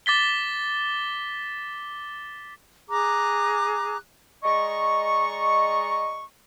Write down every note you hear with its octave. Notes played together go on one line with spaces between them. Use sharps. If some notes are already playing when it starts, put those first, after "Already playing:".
D6 A6 B6 G7
G#4 A#5 D6 F#6
G#3 D5 D#5 A#5 C#6